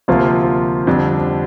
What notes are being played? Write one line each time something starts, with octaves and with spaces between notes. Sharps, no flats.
D2 C3 F3 A#3 F4
F2 D3 G3 D4